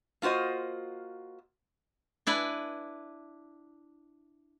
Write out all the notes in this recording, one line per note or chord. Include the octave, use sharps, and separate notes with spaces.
A#3 F4 F#4 C5 D#5
D4 E4 B4 G#5